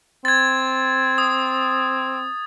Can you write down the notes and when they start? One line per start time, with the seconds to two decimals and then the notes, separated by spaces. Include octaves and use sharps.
0.25 C4 G#6 A6
1.18 D#6